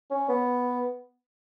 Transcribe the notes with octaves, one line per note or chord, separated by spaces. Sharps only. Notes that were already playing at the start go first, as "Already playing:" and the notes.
C#4
B3